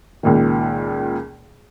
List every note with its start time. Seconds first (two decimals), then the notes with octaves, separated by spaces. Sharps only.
0.23 C#2 A#2 D#3